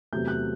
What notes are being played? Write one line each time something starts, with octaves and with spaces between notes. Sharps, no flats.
E2 C3 F#3 A3 G6
F#6